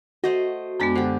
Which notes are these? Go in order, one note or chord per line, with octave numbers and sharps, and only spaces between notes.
A3 F#4 C5 D#5
F#2 G#3 B3 D4 G5
D3 G4 C5